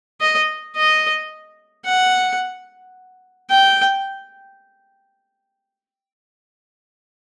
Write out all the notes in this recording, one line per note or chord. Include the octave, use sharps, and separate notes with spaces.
D#5
D#5
F#5
G5